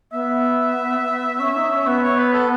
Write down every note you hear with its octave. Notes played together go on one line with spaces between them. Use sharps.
B3 E5
C#4
D#4
C#4
B3
C#5
B4
A4